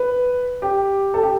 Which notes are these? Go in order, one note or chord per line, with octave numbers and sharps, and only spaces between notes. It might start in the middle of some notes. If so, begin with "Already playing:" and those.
Already playing: B4
G4
A4
G4